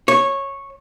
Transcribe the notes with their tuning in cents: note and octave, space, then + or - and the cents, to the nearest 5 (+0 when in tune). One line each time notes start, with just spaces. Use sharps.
C#5 -10